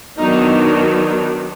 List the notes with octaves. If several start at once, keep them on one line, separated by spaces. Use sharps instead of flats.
D#3 F#3 B3 D4 D#4